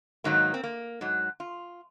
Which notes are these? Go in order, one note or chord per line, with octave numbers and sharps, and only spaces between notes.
G#2 D#3 F#3 A#3
C4
A#3
G#2 F#3
F4